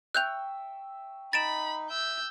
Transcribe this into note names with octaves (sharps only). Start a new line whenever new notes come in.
E5 G5 C#6 F#6 G6 F7
D#4 B5 A6 D7 E7
E5 E6 G6